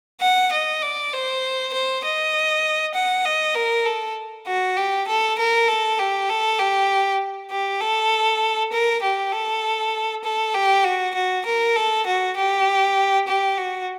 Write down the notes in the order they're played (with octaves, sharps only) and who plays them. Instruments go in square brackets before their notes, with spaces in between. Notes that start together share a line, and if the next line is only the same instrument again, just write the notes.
[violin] F#5
D#5
D5
C5
C5
D#5
F#5
D#5
A#4
A4
F#4
G4
A4
A#4
A4
G4
A4
G4
G4
A4
A#4
G4
A4
A4
G4
F#4
F#4
A#4
A4
F#4
G4
G4
F#4